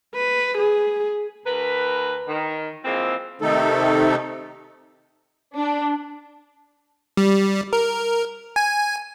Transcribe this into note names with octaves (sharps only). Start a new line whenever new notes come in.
B4
G#4
D2 A#4 B4
D#3
E3 F3 G#3 A#3 C4
C3 D#3 A3 D#4 A4
D4
G3
A#4
G#5